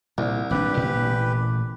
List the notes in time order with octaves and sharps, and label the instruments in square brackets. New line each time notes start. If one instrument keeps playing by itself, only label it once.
[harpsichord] C2 [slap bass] A#2
[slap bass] G#1 A#2 D4 [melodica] G4 B4
[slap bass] A1 A#2